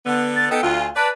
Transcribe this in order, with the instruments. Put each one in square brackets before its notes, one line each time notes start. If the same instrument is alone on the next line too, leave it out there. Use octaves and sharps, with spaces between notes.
[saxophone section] D3 B3
[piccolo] A6
[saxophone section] B3 D#4 A4 [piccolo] G5
[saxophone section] D2 D3 F4
[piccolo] G#5
[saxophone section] B4 D5 [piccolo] A5